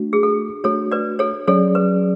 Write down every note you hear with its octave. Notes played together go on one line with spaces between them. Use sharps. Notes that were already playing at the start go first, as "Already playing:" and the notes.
Already playing: A3 D4 F#4
G#4
A4
A3 D4 F#4 A4 C#5
B4 D5
A4 C#5
F#3 C#4 G#4 A4 C#5 D5
B4